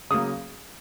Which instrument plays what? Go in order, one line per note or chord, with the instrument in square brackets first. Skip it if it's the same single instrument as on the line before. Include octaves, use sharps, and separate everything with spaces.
[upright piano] C#3 F#3 A#3 D#6